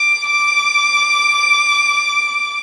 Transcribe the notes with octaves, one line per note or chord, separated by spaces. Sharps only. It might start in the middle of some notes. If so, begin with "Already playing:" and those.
Already playing: D6
D6